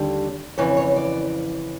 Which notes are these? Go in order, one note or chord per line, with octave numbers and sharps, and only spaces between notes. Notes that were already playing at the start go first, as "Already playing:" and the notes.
Already playing: D#2 D3 G3
F2 C#3 E3 C#5
C#5
D5